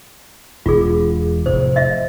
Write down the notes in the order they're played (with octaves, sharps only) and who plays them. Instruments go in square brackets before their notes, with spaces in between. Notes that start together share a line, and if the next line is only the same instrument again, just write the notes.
[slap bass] E1 [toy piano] F4 G#4
[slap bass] F1 A2 [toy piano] C5
[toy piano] D#5 E5